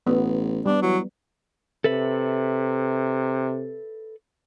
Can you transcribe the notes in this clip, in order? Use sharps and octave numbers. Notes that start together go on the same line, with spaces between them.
A1 B3
G3 B3 D4
E3 F#3
C3 A4 B4 E5